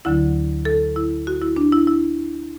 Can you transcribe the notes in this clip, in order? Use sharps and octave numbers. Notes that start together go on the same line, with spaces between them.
D2 D3 F#3 E4
A4
E4
F#4
E4
D4
E4
E4